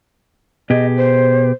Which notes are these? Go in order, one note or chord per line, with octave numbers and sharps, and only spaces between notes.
B2 G4 G#4 D#5
C5